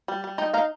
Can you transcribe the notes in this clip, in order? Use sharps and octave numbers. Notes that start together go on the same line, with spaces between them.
G3
G3
D#4 D#5 G5
D#4 F5 A#5